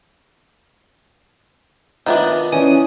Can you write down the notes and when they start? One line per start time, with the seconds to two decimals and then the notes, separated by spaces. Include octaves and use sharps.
2.06 D#3 B3 D4 F4 B4 D#5 E5 A#5
2.52 E3 C#4 D5 G#5 D#6